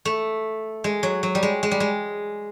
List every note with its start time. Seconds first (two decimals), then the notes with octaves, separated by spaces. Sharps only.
0.05 A3
0.84 G#3
1.03 F#3
1.23 F#3
1.35 G3
1.43 G#3
1.63 G#3
1.71 G3
1.80 G#3